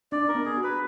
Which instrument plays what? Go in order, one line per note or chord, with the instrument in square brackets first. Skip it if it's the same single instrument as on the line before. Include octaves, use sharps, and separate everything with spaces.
[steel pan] D4 [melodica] D5
[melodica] A#4
[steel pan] B3
[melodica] G#4
[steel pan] F#4
[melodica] B4